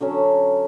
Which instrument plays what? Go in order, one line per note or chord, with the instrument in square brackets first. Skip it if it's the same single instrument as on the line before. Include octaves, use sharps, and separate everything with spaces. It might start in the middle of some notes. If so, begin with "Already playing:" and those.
[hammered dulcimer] D3 F#3 C#4